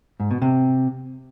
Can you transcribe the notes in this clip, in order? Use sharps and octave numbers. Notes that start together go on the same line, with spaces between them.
G#2
B2
C3